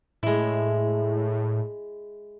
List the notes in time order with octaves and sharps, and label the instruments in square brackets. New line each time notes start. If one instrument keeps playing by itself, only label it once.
[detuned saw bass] A2 [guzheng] G#3 E4